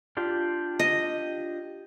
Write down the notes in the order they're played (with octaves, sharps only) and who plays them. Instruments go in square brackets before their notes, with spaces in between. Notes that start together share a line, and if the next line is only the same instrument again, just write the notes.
[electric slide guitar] D4 F4 G4
[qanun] D#5